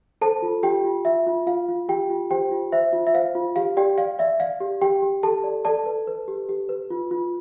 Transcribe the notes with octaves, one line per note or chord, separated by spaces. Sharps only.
A4 C5 A5
F4
F4 G4 G5
F4
F4 E5
F4
F4 F5
F4
F4 G4 G5
F4
G4 C5 G5
F4
C5 E5
F4
E5
C5 F5
F4
G4 F5
G4 D5 G5
D5 F5
D5 E5
D5 F5
G4
G4 G5
G4
G4 A4 A5
D5
A4 D5 A5
B4
B4
G4
G4
B4
F4
F4